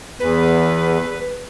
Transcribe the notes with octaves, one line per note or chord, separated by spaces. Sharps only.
E2 B4